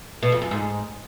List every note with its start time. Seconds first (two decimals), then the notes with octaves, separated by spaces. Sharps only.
0.23 B2
0.32 F2
0.42 F#2
0.51 G#2